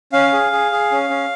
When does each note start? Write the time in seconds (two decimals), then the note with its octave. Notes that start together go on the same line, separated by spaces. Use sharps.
0.13 C#4 F5
0.33 G#4
0.52 G#4
0.72 G#4
0.91 C#4
1.10 C#4